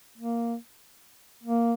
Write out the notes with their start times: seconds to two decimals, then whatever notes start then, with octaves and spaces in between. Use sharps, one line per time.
0.18 A#3
1.43 A#3